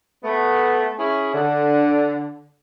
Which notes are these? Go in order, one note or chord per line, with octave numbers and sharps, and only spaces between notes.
A3 B3
C#4 E4 G#4
D3